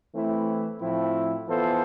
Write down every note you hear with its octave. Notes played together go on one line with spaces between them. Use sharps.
E3 A3 C4 E4
A2 F3 C4 E4
E3 B3 F4 A4 C5